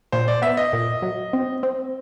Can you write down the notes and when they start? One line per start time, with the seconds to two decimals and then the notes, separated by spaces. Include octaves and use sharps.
0.12 A#2 C5
0.28 D5
0.42 B3 E5
0.57 D#5
0.73 A#2
1.02 F#3
1.33 C4
1.63 C4